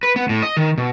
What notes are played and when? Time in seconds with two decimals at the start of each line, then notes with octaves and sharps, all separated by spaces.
0.03 B4
0.16 B3
0.29 A2
0.43 D#5
0.57 D#3
0.78 B2